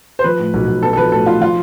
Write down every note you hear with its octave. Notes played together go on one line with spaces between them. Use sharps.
C5
F3 B4
A2
B1
B1
B3 A4
A4
F3 B4
A2 A4
A2 F4
F3 F4